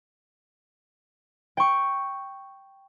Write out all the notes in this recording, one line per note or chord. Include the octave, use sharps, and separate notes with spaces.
G5 C#6